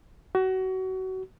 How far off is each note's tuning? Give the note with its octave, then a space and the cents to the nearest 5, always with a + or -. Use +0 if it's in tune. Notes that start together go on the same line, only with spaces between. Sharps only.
F#4 +25